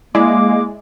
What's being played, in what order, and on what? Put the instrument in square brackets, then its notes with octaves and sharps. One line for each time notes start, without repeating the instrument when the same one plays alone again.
[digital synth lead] G#3 [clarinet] A#3 [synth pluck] E4 G#4 D5 [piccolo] D6